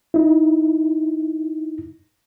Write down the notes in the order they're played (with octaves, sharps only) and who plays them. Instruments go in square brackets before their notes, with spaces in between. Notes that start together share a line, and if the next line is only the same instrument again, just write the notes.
[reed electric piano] D#4 E4